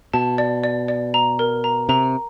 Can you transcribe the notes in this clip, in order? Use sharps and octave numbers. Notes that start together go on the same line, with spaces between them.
B2 A5
D5
D5
D5
A#5
A#4
A#5
C3 A#5